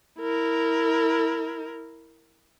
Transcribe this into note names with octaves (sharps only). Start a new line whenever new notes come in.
E4 A#4